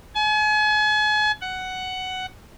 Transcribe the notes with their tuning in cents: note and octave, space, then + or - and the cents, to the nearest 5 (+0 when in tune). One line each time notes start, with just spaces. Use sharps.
G#5 +40
F#5 +10